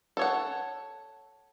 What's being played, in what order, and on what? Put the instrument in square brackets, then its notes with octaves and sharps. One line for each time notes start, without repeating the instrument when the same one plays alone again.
[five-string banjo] A4 C#5 F#5